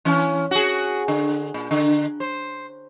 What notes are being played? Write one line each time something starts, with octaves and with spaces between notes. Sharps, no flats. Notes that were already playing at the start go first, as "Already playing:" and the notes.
E3 C#4
F#4 G#4
D3
A#2
D3
C5